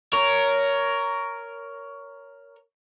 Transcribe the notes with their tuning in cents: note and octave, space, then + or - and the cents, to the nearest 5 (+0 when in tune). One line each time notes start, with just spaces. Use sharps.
A#4 +0 C#5 +15